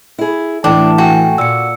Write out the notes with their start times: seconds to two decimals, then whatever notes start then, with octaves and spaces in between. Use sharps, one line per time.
0.18 E4 G#4
0.64 A2 E3 A3 D4 A5 D6
0.98 F#4 G5 G#5
1.38 A#2 E6 C#7